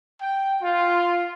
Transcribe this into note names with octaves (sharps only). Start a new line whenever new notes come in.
G5
F4